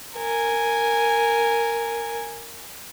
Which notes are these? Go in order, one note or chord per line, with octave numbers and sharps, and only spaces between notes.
A#4 G#5